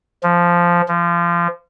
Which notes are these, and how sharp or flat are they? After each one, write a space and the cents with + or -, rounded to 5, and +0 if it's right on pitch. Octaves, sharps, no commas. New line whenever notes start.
F3 -5
F3 -25